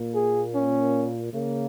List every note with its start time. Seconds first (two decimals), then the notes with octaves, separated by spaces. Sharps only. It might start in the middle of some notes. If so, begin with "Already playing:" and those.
Already playing: A#2 A#3
0.15 G#4
0.54 C#4
1.33 C#3 A#3